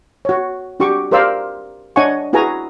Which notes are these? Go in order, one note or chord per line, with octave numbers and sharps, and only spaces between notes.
F#4 C#5
D4 F#4 G4 C#6 D6
G4 A#4 C5 D5 F5 E6
D4 C#5 D#5 F#5 G#5 C#6
E4 F#4 G#4 B4 G#5 A#5